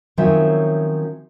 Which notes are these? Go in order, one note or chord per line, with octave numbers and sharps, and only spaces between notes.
D#3 F3 F#3 C4 C#4 E5